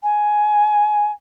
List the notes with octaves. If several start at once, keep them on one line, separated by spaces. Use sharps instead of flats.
G#5